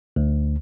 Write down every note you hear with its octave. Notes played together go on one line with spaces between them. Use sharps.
D2